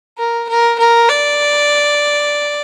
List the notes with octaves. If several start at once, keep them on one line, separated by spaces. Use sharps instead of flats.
A#4
A#4
A#4
D5